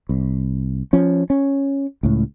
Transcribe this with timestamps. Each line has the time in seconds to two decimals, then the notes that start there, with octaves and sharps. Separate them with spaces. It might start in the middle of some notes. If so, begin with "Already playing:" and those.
0.09 C2
0.93 F3 C#4
1.30 C#4
2.03 C#2 A2